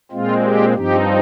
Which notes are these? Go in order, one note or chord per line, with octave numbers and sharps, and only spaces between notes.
A#2 G#3 C4 F4
G4
G2 F3 C4 D#4 G4